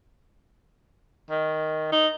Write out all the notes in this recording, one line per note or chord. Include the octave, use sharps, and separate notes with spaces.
D#3
D#4